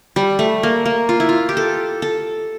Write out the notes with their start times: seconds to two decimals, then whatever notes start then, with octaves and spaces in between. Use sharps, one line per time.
0.16 G3
0.39 A3
0.63 A#3
0.85 A#3
1.09 F4
1.20 E4
1.29 F4
1.49 G4
1.57 A4
2.02 A4